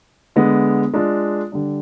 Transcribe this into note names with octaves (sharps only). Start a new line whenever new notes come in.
D3 G#3 B3
G#3 D4 F4
D3 G3 D4